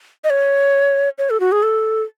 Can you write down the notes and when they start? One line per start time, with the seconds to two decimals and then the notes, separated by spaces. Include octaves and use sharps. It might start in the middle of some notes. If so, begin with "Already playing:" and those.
0.24 D#5
0.30 C#5
1.18 C#5
1.30 A4
1.40 F#4
1.52 G#4
1.63 A4